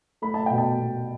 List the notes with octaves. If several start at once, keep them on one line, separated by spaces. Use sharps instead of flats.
A3 B5
A5
B2 G5
A5
B2